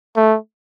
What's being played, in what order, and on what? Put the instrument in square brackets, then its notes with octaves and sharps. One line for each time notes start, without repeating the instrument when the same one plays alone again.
[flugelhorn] A3